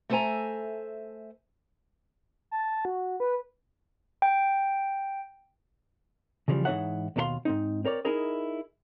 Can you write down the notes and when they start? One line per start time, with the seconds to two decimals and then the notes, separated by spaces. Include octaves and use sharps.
0.09 A3 A4 C5 E5 G#5 A#5
2.51 A5
2.85 F#4
3.20 B4
4.22 G5
6.48 C#3 E3 F3 G3
6.65 G#2 E3 D#4 C#5 E5 F#5
7.16 D#2 B2 D4 A4 F5 C6
7.45 G#2 C4 D#4
7.85 C4 A#4 C#5 D5
8.05 D#4 E4 G#4 A#4 D#5